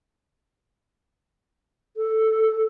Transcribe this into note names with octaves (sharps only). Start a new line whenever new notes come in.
A4